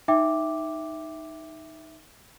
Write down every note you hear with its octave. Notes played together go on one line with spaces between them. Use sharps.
D#4 E5 G5 D6